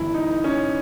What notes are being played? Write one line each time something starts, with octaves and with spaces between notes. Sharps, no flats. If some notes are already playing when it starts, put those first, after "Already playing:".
Already playing: G1 G2 E3 E4
D#4
C#4